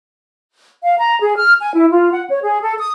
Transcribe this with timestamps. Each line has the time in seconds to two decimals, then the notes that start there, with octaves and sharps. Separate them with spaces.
0.82 F5
0.98 A#5
1.20 G#4
1.35 F6
1.60 G#5
1.74 E4
1.90 F4
2.11 F#5
2.29 C#5
2.41 G#4
2.62 A4
2.78 D#6